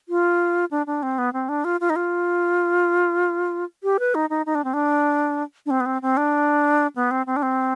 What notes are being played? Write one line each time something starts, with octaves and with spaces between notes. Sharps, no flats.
F4
D4
D4
C4
B3
C4
D4
F4
F4
D#4
F4
G4
B4
D#4
D#4
D#4
D4
C4
D4
D4
C4
B3
C4
C4
D4
B3
C4
C4
D4
C4